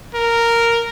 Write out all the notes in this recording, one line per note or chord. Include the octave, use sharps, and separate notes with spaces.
A#4